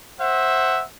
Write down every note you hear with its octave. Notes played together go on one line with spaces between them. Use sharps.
C5 E5 F#5